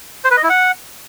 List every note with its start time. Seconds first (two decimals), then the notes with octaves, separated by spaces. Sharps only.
0.25 C5
0.31 B4
0.37 D#5
0.43 E4
0.50 F#5